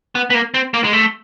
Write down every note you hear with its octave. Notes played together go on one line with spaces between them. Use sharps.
B3
B3
A#3
C4
A#3
G#3
A3